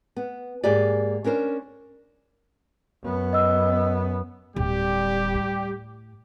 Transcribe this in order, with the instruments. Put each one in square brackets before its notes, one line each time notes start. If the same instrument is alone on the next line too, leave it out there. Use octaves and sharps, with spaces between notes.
[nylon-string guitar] B3
G#2 A#3 G4 G#4 D5
C#4 D4 A#4 C5
[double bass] F#2 B3
[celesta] D#5 E6
[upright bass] D1 [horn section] G3 G4
[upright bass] A2